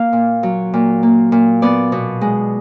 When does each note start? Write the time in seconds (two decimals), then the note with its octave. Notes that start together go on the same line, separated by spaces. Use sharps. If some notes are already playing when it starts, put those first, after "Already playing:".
Already playing: A#3 F5
0.13 A#2
0.43 F#3
0.73 A#2
1.03 A#3
1.32 A#2
1.62 B3 D5
1.92 B2
2.21 G#3